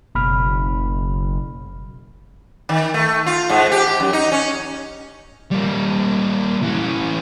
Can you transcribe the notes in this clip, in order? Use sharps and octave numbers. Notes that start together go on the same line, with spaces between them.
F#1 B2 B5 F6
D#3
A3
F4
G#2
G4
F#2
D#4
C#4
G3 A#3
E3 C#4